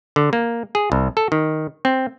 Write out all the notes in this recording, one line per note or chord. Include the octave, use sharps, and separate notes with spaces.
D3
A#3
G#4
C2
A4
D#3
C4